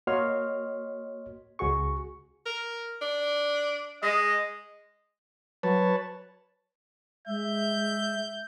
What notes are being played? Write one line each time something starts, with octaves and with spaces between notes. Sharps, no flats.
A#3 F#4 C#5 D#5 C6 F6
C#2 F#4 G#4 C#6
A#4
D4
G#3 D#5
F#3 B4 C#5 A5
G#3 E5 G6